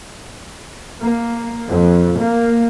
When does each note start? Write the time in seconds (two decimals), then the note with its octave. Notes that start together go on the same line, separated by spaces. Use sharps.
1.01 A#3
1.68 F2
2.20 A#3